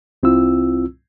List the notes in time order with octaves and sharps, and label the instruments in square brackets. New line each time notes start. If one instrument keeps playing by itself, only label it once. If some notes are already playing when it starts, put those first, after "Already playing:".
[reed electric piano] C2 C4 E4 F4 E6